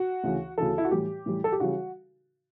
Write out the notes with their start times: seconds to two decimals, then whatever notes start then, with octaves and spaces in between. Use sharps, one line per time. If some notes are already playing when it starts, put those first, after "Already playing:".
Already playing: F#4
0.24 D2 C#3 E3
0.58 D2 C#3 E3 A4
0.78 E4
0.85 F#4
0.91 A2 E3 G3 G4
1.26 A2 E3 G3
1.44 A4
1.52 G4
1.60 C#3 E3 G3 F#4